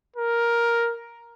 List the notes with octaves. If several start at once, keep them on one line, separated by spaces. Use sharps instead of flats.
A#4